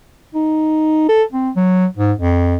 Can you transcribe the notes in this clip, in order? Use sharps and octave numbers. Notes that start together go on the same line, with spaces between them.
D#4
A4
C4
F#3
G#2
F2